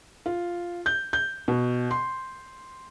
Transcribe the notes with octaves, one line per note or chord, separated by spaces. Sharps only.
F4
G6
G6
B2
C6